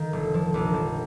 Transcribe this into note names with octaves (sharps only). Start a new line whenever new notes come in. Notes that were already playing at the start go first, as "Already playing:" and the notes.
Already playing: D#3 F5
F1
F3
A#1
F3